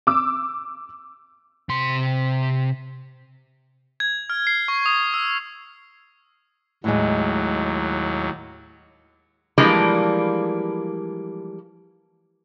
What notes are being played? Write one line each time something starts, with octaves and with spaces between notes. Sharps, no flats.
D6 E6
C3 C6
G#6
F6
C7
C#6
D#6
E6
D#2 A2 F#3 G#3
E3 F3 G3 G#3 A#3 D4